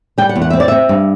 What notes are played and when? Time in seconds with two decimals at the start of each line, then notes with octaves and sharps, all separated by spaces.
0.18 G3 G5
0.29 F#5
0.36 E2
0.42 F#5
0.50 C4 E5
0.60 D5
0.68 C4 E5
0.89 G2